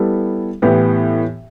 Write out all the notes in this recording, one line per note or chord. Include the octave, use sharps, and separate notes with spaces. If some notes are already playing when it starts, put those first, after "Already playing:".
Already playing: G3 B3 E4 A4
A2 E3 B3 G4